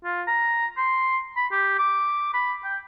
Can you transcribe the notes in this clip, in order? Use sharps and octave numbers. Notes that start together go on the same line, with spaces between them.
F4
A#5
C6
B5
G4
D6
B5
G5